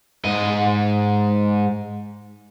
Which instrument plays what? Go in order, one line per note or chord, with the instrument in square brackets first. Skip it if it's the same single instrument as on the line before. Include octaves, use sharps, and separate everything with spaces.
[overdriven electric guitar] G#2 D#5